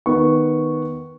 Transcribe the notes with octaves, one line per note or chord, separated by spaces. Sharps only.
D#3 B3 C#6